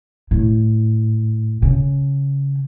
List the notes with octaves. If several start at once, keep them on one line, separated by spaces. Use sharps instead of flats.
A2
C#3